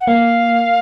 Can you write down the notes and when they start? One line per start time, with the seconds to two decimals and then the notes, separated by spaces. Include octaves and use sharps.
0.01 F#5
0.07 A#3 F5